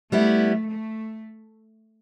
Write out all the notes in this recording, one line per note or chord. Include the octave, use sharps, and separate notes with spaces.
G3 A3 B3 E4
A3